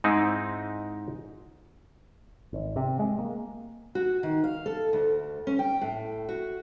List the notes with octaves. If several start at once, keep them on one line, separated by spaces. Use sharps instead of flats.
G#2 G#3 C4 D#4 E4
G#1
C3
G#3
A#3
F#4
D#3
F5
A4
D2
C#4
G5
A2
F#4